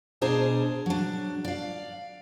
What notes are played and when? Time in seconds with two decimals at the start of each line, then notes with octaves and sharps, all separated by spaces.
0.21 B2 D4 G#4 C5 A5 A#5
0.86 F#3 D4
1.45 D5 F5